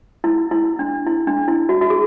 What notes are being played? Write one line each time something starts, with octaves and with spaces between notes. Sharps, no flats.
E4
E4
D4
E4
D4
E4
F#4
F#4
G#4